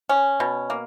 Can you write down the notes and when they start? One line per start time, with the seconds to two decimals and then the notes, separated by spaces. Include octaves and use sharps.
0.09 C#4
0.40 B2
0.70 A#3